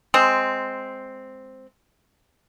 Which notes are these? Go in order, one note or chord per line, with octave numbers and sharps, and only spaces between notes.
G#3 C4